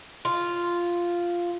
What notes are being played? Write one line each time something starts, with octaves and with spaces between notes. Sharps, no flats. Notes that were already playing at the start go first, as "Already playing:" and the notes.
F4